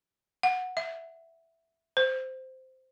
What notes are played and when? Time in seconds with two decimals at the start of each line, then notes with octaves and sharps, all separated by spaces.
0.43 F#5
0.77 E5
1.97 C5